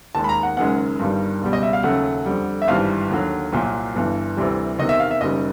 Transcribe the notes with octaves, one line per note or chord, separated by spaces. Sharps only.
D#2 D#3 G#3 A5
B5
A#5
F#5
F#1 F#2 D#3 G#3 F#5
G1 G2 D#3 G3
C#2 B2 G3
D#5
E5
F5
D#2 C#3 F#3 A3 F#5
F2 D3 G3
E5
G#1 G2 E3 G3 F5
D#2 D3 F#3
C2 A#2 F#3
G1 G2 E3
D2 C3 E3 G3
E2 C3 D#3 D#5
E5
F5
E5
F#1 F#2 D#3 G3 D#5